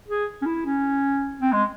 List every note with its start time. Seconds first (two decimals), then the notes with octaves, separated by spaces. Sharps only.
0.08 G#4
0.42 C#4
0.46 E4
0.65 C#4
1.41 C4
1.52 G#3